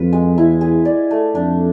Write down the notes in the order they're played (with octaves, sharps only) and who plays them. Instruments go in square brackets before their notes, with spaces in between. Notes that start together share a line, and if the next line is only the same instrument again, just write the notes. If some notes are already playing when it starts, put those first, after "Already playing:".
Already playing: [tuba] F2 [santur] F4 B4
[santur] G#3
[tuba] E2 [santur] E4
[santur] G#4
D5
A3
[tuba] F2 [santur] D4